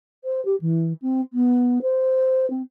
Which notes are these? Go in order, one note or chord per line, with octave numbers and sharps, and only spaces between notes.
C5
G4
E3
C4
B3
C5
C4